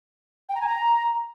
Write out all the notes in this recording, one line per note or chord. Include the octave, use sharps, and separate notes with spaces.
G5
A#5
G#5
A#5